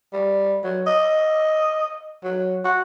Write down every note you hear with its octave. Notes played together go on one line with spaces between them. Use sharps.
G3
F#3
D#5
F#3
F#4